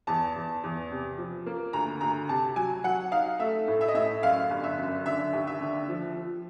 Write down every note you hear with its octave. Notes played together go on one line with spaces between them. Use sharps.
E2 A5
E2
E2
C3
F3
A#3
D2 A#5
D2 A#5
C3 A5
F#3 G#5
F#3 F#5
D#4 F5
A3 E5
A2
E5
D#5
A2 E5
F#2 F5
G1
E5
F#2
D3 E5
D#2
E5
D3
F3
F3